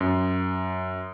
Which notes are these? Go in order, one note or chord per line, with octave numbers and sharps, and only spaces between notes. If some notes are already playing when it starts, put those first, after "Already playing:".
F#2